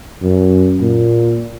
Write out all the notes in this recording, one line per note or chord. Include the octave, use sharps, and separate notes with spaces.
F#2
A#2